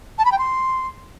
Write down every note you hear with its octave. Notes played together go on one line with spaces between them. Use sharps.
A5
B5
G5
C6